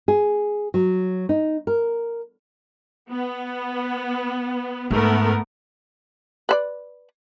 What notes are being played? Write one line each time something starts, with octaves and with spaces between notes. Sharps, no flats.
G#4
F#3
D#4
A#4
B3
G#2 A3 B3 A#4
B4 C5 D5